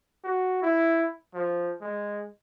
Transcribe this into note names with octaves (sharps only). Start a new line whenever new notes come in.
F#4
E4
F3
G#3